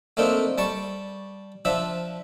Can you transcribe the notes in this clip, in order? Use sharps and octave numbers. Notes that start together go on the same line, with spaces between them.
A3 A#3 C4 D4 D#4
G3 A5 C#6
F3 D4 E5